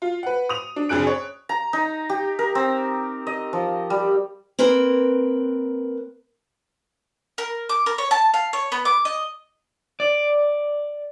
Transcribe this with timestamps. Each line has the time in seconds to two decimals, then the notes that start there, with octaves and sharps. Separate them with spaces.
0.02 F4
0.23 B4 F#5
0.49 D#6 F7
0.76 D4
0.89 F#1 F2 D4 G#4 F#6 D7
1.07 C#5
1.49 A#5
1.73 D#4
2.10 G4
2.39 A#4
2.55 C4
3.27 D#5
3.53 F3
3.90 G3
4.59 A#3 C4 A#4 B4
7.38 A#4
7.69 D6
7.86 A#4
7.98 C#5
8.11 A5
8.34 F5
8.53 C#5
8.72 B3
8.85 D6
9.05 D#5
10.00 D5